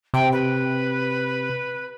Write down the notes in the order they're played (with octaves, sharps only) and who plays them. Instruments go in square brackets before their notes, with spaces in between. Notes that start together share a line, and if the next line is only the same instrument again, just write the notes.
[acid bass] C3 [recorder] G5
[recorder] B4